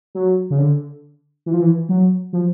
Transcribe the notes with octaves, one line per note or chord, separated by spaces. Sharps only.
F#3
C#3
D3
E3
F3
E3
F#3
F3